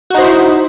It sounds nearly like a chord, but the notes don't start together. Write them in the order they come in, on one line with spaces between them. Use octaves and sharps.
F#4 D#4 C5 E4